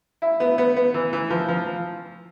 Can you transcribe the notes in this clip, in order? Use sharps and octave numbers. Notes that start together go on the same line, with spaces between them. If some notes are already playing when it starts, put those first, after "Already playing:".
E4
B3
B3
B3
E3
E3
F3
F3